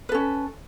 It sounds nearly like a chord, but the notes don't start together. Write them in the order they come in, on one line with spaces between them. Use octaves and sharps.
B4 A4 C#4